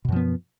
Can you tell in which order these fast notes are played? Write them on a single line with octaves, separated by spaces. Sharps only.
B2 F#2 F3 B3